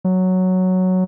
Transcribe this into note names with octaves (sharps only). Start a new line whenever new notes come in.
F#3